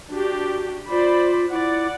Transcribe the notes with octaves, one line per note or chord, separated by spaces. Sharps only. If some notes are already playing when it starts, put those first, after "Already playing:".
D4 F#4 G4
F4 C5 D5 B5
E4 D5 F#5